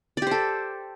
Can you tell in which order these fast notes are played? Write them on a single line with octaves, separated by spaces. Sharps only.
D5 G4 C5 A4